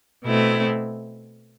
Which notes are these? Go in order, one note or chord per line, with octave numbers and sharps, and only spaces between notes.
B2 A3 C4 E4